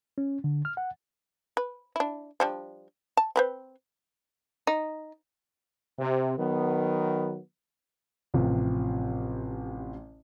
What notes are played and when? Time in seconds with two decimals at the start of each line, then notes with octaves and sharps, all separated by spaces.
0.18 C#4
0.44 D3
0.65 F6
0.77 F#5
1.57 B4
1.96 D4 E4
2.40 F3 G3 D4
3.17 A5
3.36 C4 B4 C5
4.67 D#4
5.98 C3
6.38 D#3 F#3 B3
8.34 A1 C3 F3